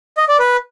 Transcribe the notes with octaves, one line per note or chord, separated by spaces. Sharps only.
D#5
D5
B4